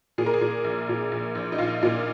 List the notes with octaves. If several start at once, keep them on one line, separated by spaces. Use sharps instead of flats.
A#2 G#4
A#4
G#4
A#2
A#1
A#2
A#1
A#1
D#4
A#1 F4
A#2